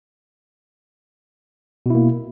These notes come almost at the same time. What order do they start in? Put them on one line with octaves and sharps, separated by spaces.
B2 E4 A#3